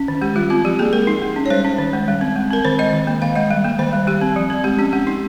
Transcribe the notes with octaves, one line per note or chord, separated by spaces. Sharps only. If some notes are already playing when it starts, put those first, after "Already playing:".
Already playing: C#4
D#3
G#3 G4
G3 F4
C4 F4
F3 G4
A#3 G#4
G#3 A#4
D#4
G#3
C#4
C#5
G3 C5
C#4
D#3
G#3
G3
C4
G#3
C4 A#4
D#3 C5
G#3 D#5
D#3
A#3
D#3 F5
G#3 D#5
G3
A#3
D#3 C5
G3
G3 G4
C4
F3
C4
G#3 G4
C#4 G4
G#3 G4
D#4